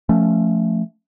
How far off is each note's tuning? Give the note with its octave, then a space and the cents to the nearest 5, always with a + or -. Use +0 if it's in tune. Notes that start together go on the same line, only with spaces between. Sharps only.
F3 +0 A3 +0 C#4 +0